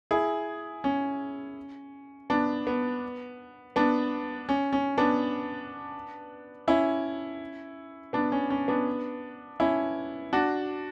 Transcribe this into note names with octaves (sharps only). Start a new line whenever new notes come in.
E4 G#4
C#4
B3 D4
B3
B3 D4
C#4
C#4
B3 D4
C#4 E4
B3 D4
C#4
C#4
B3 D4
C#4 E4
D4 F#4